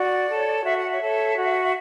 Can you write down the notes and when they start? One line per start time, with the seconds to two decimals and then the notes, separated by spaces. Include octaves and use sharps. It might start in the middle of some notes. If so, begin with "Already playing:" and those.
Already playing: F#4 D5
0.29 A4 C#5
0.65 F#4 E5
0.78 F#5
0.91 C#5 E5
1.01 A4 C#5
1.36 F#4